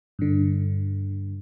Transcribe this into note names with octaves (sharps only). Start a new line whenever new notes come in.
G2 D3